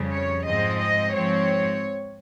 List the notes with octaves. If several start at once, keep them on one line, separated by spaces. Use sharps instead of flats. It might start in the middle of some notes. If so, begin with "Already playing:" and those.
Already playing: F2 C#3 G3
C#5
G#2 F3 G#3 C4 D#5
D#5
G#2 F3 C4 C#5